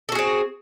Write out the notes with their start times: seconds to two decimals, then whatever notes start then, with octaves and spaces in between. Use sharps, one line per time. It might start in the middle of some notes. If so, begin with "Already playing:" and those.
0.09 A4
0.12 F#4
0.15 G#4
0.19 C4